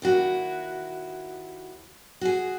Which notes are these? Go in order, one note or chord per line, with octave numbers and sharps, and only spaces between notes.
D#2 E4 F#4
F#4 G#4